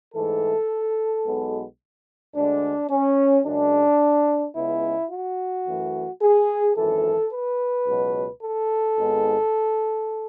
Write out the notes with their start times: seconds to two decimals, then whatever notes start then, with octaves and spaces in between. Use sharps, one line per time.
0.14 G#2 E3 A3 A4
1.25 B1 B2 G#3 B3
2.35 D2 D3 G#3 D4
2.90 C#4
3.45 F#2 C#3 G#3 D4
4.56 C#2 C#3 G#3 B3 E4
5.11 F#4
5.67 F#2 E3 A3
6.22 G#4
6.77 G#1 F#2 E3 A4
7.32 B4
7.86 C#2 B2 F#3
8.42 A4
8.97 G#1 G#2 G#3 B3